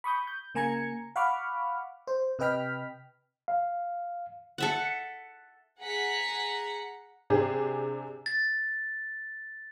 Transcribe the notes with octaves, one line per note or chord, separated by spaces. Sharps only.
B5 C#6 D#6 G6
G6
C#3 A#3 G#5 A#5 G#6 C#7
F5 F#5 B5 C#6 D6 F6
C5
C3 B4 D#5 G5 F6 B6
F5
A4 E5 F#5
G#4 F#5 A#5 B6 C#7
C3 D4 G4 G#4
A6